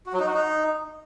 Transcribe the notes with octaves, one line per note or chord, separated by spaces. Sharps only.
F#4
F#3
D#4
F#4
D#4